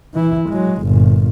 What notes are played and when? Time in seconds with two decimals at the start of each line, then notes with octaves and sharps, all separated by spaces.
0.14 E3 E4
0.49 F#3 G#3
0.83 G1 A#2